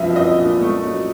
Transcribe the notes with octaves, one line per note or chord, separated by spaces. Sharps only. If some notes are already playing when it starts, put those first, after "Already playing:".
Already playing: C2 F#2 F3 D#5 E5
C2 D#5
A#2
A3
F#3